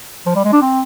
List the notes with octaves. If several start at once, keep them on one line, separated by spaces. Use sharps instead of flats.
F3
G3
G#3
D4
C4